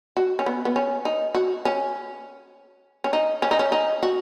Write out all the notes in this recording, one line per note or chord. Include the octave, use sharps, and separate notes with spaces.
F#4
C#4
B3
B3
C#4
D#4
F#4
C#4
C#4
D#4
C#4
D#4
C#4
D#4
F#4